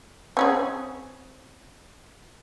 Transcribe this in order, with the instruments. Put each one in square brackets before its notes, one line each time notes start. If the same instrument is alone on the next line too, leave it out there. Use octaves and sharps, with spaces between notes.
[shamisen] C4 C#4 G#4